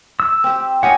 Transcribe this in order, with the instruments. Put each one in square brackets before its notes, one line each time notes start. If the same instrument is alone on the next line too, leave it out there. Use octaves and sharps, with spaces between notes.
[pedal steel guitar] E6
[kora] C4 G4
[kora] C#4 G4 D#5 [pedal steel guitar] F#5